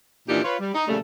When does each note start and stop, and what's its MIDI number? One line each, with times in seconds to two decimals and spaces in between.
0.29 0.42 46
0.29 0.42 52
0.29 0.42 53
0.29 0.42 62
0.29 0.42 63
0.29 0.42 67
0.44 0.56 65
0.44 0.56 71
0.44 0.56 73
0.60 0.71 55
0.75 0.85 63
0.88 0.97 46
0.88 0.97 49
0.88 0.97 53
0.88 0.97 55
0.88 0.97 57